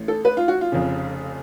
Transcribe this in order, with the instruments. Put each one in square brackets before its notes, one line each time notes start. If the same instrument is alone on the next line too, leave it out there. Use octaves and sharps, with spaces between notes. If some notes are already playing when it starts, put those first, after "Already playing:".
Already playing: [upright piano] A1 A2
A4
B4
F4
F#4
F4
F1 F2 C#3